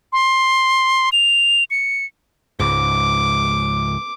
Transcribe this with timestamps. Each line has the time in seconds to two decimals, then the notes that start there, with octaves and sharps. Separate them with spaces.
0.13 C6
1.12 F7
1.71 C#7
2.59 C#2 G#2 D6